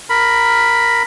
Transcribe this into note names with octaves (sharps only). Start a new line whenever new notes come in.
A#4 B5